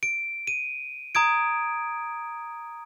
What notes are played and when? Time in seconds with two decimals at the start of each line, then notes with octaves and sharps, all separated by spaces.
0.03 D7
0.47 D#7
1.15 A#5 D#6 G#6 D7